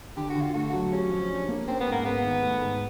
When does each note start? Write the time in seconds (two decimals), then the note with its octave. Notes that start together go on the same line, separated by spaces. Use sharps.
0.17 D3 G4
0.30 F#4
0.35 D3
0.41 F4
0.54 A3 F#4
0.73 F#3
0.92 C#4 G4
1.11 F3
1.30 D4
1.49 A#3
1.67 C4 C#4
1.80 B3
1.86 G#2
1.92 A#3
2.05 G#3 B3
2.24 D#3
2.42 A3
2.61 G#2